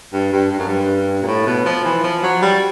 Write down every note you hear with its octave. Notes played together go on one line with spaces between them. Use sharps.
G2
G2
G2
F#2
G2
A#2
A2
B2
F3
E3
F3
F#3
G3